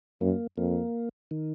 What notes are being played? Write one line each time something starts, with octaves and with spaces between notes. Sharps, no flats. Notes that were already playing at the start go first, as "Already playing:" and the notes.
F#2 A#3
F2 A#3
D#3